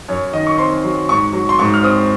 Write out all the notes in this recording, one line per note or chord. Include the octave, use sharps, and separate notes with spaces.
F#2 C#5
D#3 D#5
C#6
C4 C6
F#3
G#2 C#6
F#3
C6
G#2 C#6
F6
C4 D#6